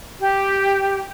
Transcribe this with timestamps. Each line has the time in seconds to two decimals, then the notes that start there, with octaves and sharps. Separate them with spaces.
0.20 G4